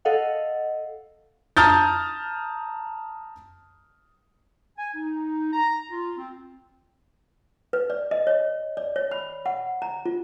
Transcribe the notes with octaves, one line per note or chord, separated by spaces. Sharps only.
A4 D#5 F5 F#5
A5 A#5 D#6 F6 G6 A6
G#5
D#4
A#5
F4
C4
B4
D5
D#5
C#5
D5
C#5
B5
F#5
A#5
F4